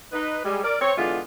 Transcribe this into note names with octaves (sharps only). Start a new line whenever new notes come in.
D#4 B4
G3 G#3
A#4 D5
C4 C#5
D3 E3 G#3 B3 F4